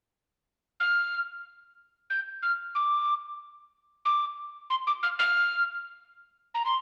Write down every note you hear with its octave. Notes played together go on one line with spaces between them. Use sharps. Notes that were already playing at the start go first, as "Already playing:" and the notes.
F6
G6
F6
D6
D6
C6
D6
F6
F6
A#5
C6